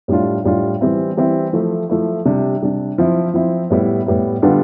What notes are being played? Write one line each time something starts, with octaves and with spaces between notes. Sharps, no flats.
A2 G3 D4 F4
A2 G3 D4 F4
E3 G3 C4 E4
E3 G3 C4 E4
F3 A3 E4
F3 A3 E4
C3 G3 D4
C3 G3 D4
F3 C4 E4
F3 C4 E4
A2 G3 B3 E4
A2 G3 B3 E4
D3 G3 B3 D4 F4